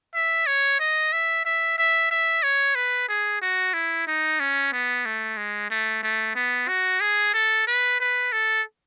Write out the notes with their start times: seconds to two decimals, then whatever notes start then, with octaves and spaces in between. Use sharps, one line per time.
0.15 E5
0.47 C#5
0.80 D#5
1.13 E5
1.45 E5
1.78 E5
2.11 E5
2.43 C#5
2.75 B4
3.09 G#4
3.42 F#4
3.73 E4
4.07 D#4
4.40 C#4
4.73 B3
5.05 A3
5.37 G#3
5.70 A3
6.03 A3
6.35 B3
6.68 F#4
7.01 G#4
7.34 A4
7.67 B4
8.00 B4
8.32 A4